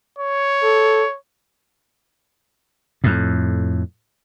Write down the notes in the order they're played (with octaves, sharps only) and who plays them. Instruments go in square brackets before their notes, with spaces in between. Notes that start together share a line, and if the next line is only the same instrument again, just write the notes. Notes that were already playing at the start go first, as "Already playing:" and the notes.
[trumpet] C#5
[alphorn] A4
[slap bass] F2 A2